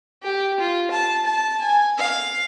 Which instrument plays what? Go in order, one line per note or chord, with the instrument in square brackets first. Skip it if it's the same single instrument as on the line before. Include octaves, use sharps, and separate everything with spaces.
[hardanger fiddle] G4
F4
A5
A5
G#5
F5